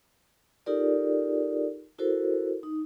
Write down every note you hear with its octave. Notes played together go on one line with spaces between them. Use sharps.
D#4 F4 G4 A4 A#4 D5
E4 F#4 A4 A#4 C5
D#4